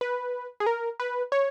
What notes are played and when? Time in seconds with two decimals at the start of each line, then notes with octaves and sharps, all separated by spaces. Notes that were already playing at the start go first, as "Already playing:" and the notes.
0.01 B4
0.60 G#4
0.66 A#4
1.00 B4
1.32 C#5